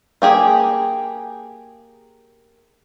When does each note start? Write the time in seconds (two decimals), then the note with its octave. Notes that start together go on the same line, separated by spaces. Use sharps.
0.22 A#3 G4 G#4